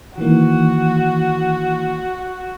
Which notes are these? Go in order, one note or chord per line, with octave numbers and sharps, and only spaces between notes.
D#3 E3 A#3 F#4